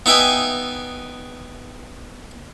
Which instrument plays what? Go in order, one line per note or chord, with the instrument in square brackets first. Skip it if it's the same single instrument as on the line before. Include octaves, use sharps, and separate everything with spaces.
[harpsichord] B3 D#4 E5 G5 G#5